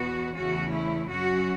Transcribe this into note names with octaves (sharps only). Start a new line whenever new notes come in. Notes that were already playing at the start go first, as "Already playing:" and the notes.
Already playing: E2 B2 B3 F#4
E2 C#3 A3 C#4 F#4
E4
F#2 F#3 C#4 F#4